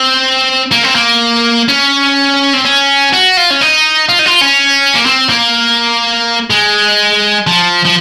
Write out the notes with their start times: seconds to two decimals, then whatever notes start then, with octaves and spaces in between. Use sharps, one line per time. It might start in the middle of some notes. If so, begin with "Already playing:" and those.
Already playing: C4
0.72 A#3
0.84 C4
0.95 A#3
1.68 C#4
2.53 C4
2.65 C#4
3.13 F#4
3.37 F4
3.51 C#4
3.61 D#4
4.09 F4
4.19 D#4
4.26 F4
4.41 C#4
4.95 A#3
5.06 C4
5.29 A#3
6.50 G#3
7.47 F3
7.85 F3